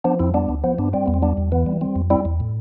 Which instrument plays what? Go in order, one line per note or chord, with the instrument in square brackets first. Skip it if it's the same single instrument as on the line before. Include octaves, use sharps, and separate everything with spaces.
[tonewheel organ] F3 B3 D4
F2 C4 E4
G3 B3 D4
D2
F3 B3
G2 B3 D4
G3 C4
E2 B3
C4
G3 B3 D4
E2
E3 B3
G3
G3 C4
F2
G3 C4 E4
E2
A2